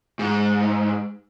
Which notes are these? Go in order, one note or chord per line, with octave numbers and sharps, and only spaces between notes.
G#2